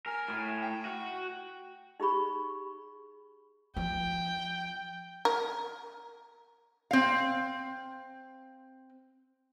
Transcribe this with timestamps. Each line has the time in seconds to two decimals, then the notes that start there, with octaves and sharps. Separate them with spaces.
0.06 A#4 G#5
0.28 A2
0.61 G5
0.85 F#4
2.00 D#4 G4 G#4 B5 C#6
3.77 F3 G5
5.25 A#4
6.91 C4 F5